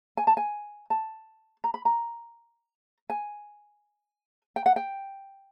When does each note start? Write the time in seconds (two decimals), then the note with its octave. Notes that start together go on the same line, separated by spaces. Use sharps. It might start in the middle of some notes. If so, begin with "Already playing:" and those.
0.17 G#5
0.27 A5
0.37 G#5
0.90 A5
1.64 A#5
1.74 B5
1.85 A#5
3.10 G#5
4.56 G5
4.66 F#5
4.76 G5